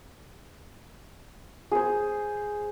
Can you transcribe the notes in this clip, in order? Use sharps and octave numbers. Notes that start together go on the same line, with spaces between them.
G#4 C5